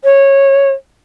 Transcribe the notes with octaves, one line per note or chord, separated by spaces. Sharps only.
C#5